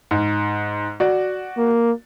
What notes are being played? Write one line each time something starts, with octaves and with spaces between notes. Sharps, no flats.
G#2
F#4 D5
A#3